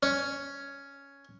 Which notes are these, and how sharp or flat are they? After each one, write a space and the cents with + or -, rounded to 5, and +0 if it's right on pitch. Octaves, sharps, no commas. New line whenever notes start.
C#4 +5